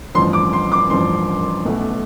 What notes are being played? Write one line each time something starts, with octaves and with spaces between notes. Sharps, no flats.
A1 G2 F3 C6
D6
C6
D6
A1 G2 F3 C6
B1 B2 A3